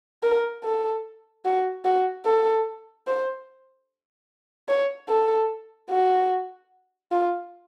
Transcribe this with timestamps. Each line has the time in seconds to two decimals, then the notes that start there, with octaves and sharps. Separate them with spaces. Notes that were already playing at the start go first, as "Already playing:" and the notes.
0.23 A#4
0.64 A4
1.45 F#4
1.85 F#4
2.25 A4
3.07 C5
4.69 C#5
5.08 A4
5.90 F#4
7.11 F4